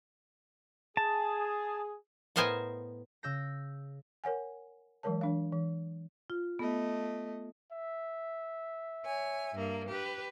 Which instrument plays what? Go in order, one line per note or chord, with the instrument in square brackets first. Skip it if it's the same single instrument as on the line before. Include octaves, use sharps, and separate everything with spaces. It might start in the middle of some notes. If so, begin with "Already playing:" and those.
[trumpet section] G#4 [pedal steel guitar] A5
[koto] A2 B3 A#4 C5 D#5 G#5
[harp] C#3 E6 G6 A#6
[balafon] A#4 C#5 F#5 G#5
E3 F#3 G#3 A#4 C#5 A5
E3 D4 F5
E3
[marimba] F4
[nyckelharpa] A3 D#5 [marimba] B3
[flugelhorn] E5
[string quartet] C#5 G#5
G2 A#3
G4 B4